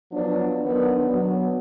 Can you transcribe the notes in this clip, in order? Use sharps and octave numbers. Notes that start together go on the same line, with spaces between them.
F3 F#3 B3 D4
D#3 F#3 B3 D4
F#3 B3